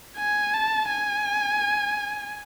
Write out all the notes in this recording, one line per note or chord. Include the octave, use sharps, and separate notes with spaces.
G#5
A5
G#5